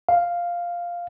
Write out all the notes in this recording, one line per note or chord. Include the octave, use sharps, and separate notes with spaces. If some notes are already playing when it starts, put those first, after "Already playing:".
F5